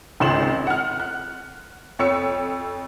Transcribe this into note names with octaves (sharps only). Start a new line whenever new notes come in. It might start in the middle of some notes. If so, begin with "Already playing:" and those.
G#1 C#2 C6 E7 F#7
F#5 F6
F#6
F2 C#5 E6 C#7